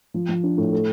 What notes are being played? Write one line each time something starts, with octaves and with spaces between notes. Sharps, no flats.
F3
F3
D4
A2
A3